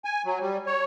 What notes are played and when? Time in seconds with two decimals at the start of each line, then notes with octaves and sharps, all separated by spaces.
0.05 G#5
0.25 F#3
0.41 G3
0.67 C#5